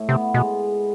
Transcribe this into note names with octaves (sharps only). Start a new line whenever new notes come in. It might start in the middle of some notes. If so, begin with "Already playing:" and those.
Already playing: A2
C3 B3
B2 G#3